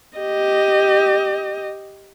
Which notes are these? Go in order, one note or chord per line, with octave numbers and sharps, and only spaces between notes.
G4 D#5